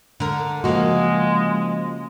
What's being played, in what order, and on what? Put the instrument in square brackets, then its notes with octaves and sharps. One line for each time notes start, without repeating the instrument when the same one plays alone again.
[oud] D3 A#4
[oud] C#3 A#3 [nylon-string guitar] F3 F#4 [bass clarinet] G#3